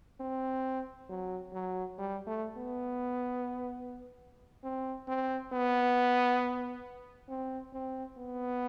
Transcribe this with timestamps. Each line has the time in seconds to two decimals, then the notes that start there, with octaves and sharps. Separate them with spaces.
0.20 C4
1.10 F#3
1.54 F#3
1.98 G3
2.27 A3
2.57 B3
4.64 C4
5.08 C4
5.53 B3
7.29 C4
7.73 C4
8.18 B3